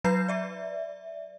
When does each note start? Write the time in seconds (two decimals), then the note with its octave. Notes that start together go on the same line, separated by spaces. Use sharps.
0.04 F#3 B4 A#5 G6 C7
0.28 D5 E5